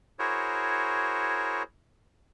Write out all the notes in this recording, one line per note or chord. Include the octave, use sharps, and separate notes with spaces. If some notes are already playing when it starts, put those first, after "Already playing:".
E4 F#4 G#4 A#4 C5 C#5